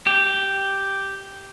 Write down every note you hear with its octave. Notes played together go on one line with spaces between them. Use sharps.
G4